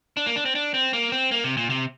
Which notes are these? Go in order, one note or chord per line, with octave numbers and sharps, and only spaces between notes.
D4
A#3
D4
C4
D4
C4
A#3
C4
A#3
C3
A#2
C3